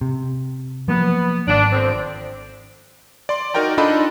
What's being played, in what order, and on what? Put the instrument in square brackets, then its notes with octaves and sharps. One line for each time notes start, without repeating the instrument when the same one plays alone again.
[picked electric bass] C3
[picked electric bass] F3 F#3 A#3 [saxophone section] B3
[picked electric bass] G#1 [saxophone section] D4
[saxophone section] D3 F3 C4
[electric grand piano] D5 C6
D#4 F#4 A#4 D5 G5 A#5
D4 D#4 F4 A4 D#5 B5